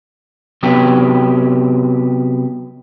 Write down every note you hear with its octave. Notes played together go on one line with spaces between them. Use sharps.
C3 F#3 B3 G4